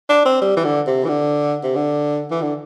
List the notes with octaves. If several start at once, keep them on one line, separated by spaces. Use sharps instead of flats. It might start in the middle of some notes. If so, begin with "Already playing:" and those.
D4
C4
G3
E3
D3
C3
E3
D3
C3
D3
E3
D3